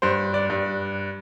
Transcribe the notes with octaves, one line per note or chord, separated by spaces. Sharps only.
G2 C5
D5
G2